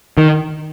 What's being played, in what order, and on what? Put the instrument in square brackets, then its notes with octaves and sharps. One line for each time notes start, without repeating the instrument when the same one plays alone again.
[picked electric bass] D#3